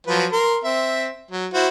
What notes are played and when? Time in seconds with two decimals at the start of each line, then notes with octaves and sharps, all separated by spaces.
0.07 F3 F#3 B4
0.32 A#4 C6
0.64 C4 E5
1.31 F#3
1.54 E4 F#4 C5